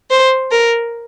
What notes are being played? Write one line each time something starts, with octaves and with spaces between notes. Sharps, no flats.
C5
A#4